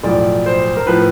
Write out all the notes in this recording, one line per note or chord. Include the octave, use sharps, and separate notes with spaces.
B1 A2 F3 D5
C5
A#4
A2 F3 B4